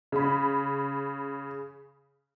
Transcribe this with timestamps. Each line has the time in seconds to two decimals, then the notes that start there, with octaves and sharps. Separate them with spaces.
0.12 C#3 B5